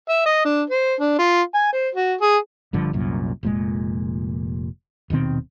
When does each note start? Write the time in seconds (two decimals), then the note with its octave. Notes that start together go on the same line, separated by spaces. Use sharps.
0.09 E5
0.26 D#5
0.45 D4
0.70 C5
1.00 D4
1.19 F4
1.54 G#5
1.73 C5
1.95 F#4
2.21 G#4
2.73 G1 G2 D3 F3
2.93 C2 F#2 A#2
3.43 F1 A#2 G#3
5.10 D#1 B2 D#3 C4